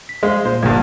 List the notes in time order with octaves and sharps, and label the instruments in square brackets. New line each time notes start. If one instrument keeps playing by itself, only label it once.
[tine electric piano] B6
[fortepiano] G#3 [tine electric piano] C5 F5 C6
[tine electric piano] A#2 [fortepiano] C5
[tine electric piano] G1 A#2 G#6 [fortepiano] C2 G2